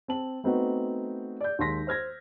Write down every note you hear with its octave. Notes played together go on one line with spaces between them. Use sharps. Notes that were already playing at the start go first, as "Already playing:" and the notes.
C4 A5 F#7
A3 B3 C4 D#4 F#4 B4
D5 G6
D#2 G#3 C6 A#6 B6
C5 F6 G#6 A#6